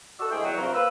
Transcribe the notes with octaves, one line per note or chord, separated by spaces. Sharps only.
F#4 A4 D5 C#6 E6
D2 G#3 E4 G#4 G5
E2 F#3
G2 C3 F3 C4 F#4 A#4
A#3 B4 E6